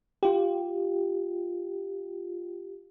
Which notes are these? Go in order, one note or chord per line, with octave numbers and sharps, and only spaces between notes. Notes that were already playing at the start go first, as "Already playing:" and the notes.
F4 G4